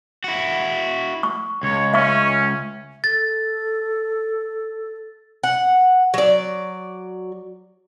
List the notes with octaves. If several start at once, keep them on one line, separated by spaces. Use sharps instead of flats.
E4 F#4
C#6
C#2 C#5
C#4 E5 C#6
A4 A6
F#5
F#3 D5